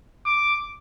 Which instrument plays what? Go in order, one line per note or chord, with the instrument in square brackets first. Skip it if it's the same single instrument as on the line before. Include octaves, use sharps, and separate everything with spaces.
[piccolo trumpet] D6